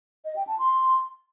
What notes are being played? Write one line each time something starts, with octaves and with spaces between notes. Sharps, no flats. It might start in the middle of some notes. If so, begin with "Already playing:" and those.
D#5
G5
A5
C6